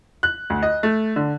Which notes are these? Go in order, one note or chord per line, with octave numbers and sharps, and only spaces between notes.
F#6
D2
D#5
A3
D3